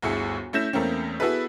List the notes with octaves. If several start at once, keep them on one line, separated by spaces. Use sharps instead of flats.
G1 D2 E4 G#4 C#7
A3 C#4 E4 G6 A#6 E7
E2 A3 A#3 C4 C#4
B3 E4 F#4 G#4 A4 B4